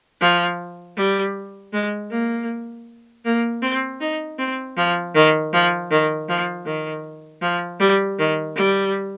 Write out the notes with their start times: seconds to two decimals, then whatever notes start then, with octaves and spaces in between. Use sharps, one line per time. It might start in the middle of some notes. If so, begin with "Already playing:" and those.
0.21 F3
0.97 G3
1.73 G#3
2.11 A#3
3.25 A#3
3.62 C4
4.00 D#4
4.39 C4
4.77 F3
5.15 D#3
5.53 F3
5.91 D#3
6.29 F3
6.66 D#3
7.42 F3
7.80 G3
8.19 D#3
8.56 G3